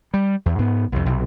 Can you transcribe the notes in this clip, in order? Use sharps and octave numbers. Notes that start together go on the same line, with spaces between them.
G3
E2
G#2 B3
C2 F2
B1 C3